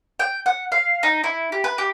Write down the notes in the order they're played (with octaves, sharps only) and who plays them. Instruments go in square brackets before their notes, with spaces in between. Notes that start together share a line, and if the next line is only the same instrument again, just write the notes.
[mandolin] G5
F#5
F5
D#4
E4
G4
B4
G4